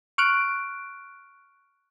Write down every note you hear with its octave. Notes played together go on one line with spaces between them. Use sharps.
C#6 F6 F#6 D7